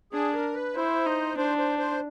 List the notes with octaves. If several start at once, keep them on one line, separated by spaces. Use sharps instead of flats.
D4 G#4
A#4
B4
E4 C5
D#4
D4 C5
C5
C5